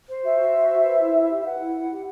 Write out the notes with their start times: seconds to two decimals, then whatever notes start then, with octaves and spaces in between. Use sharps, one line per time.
0.09 C5
0.23 F#4 E5
0.39 F#4
0.53 C5
0.69 C5
0.84 B4
0.99 E4
1.14 E4
1.29 G4
1.40 E5
1.44 B4 F#5
1.59 E4
1.75 E4
1.90 G4